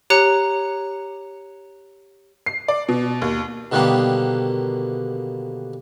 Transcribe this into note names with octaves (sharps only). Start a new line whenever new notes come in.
G4 C#5 A#5 F#6 C#7
C7
D5
B2
D#2
B2 D3 D#3 G3 A#3 B3